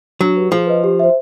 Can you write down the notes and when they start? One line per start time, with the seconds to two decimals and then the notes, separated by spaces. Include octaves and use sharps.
0.21 F#3 D4
0.36 G4 B4
0.52 F3 G#4
0.67 B4 D#5
0.84 G4
0.99 C5 E5